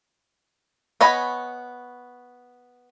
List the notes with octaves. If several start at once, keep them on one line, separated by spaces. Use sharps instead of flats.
B3 C#5 D#5 G#5 B5